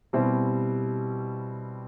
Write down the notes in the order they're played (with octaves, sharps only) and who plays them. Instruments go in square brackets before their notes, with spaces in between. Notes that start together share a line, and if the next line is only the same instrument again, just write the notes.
[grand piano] B2 G3 C4 E4 G4